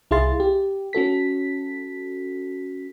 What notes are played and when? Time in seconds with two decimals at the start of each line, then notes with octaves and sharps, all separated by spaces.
0.11 C2 E4 G#4 F5 C6 A6
0.40 G4
0.93 C#4 F#4 A4 B6